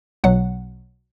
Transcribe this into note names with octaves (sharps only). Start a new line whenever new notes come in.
B1 B2 F#3 F#5